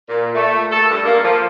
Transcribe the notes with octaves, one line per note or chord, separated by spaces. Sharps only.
A#2
A3
A4
G2
A#3
F3